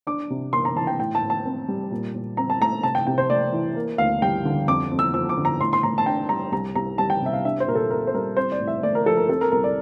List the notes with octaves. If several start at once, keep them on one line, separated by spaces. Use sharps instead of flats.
D4 D6
C3
A#3 C6
A#5
E3 A5
G5
A2 G5
A5
A2
A5
C4
G3
A#2
A#2
C4 A#5
A5
A3 A#5
C3 A5
G5
C3 G5
C5
A3 D5
E3
A#3
D2 F5
G3 G5
D3
F2 D6
F2
E6
F3 E6
D6
D3
A#5
A2 C6
C6
A2 A#5
A5
D4 G5
G3 A#5
C2 A#5
C2 A#5
G3 A5
G5
C3 E5
F5
D4 E5
C5
A#2 A#4
A4
A#3 A#4
C5
G3 A#4
C4 C5
D5
A2
E5
A3 D5
A#4
F3 A4
A#4
C4 A4
A#4
C2 A#4
D5